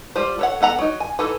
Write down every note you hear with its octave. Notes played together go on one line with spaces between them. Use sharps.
G3 F4 C5
A4 C#5 F#5
B3 A4 F#5 A#5
F#3 D#4
G#5
E3 D#4 A4